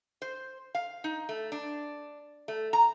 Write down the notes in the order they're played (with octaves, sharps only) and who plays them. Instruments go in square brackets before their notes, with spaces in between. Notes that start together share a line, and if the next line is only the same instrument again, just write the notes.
[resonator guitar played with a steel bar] C5
F5
D#4
A3
D4
A3
A#5